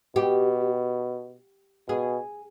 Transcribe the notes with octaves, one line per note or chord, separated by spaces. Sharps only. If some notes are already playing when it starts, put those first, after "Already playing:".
B2 G4
B2 G#4